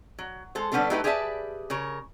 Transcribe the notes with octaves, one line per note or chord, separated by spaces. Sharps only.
F#3
G#3 A4 C5
D3 G3 B3 C#4 D4 A4
F#3 A3 D#4 G4 A4 B4
G4 G#4 B4 D5 E5 A5
C#3 A#4 C#5